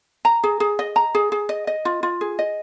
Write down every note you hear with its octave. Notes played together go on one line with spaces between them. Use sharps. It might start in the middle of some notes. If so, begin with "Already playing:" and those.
A#5
G#4
G#4
D#5
A#5
G#4
G#4
D#5
D#5
F4
F4
G#4
D#5